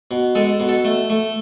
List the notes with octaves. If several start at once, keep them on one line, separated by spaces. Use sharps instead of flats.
B2
G#3 A4
B2
A4
A3
A3